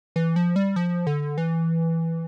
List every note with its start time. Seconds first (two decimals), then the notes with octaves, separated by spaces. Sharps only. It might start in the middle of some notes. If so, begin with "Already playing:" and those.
0.16 E3
0.36 F3
0.56 G3
0.76 F3
1.07 D3
1.38 E3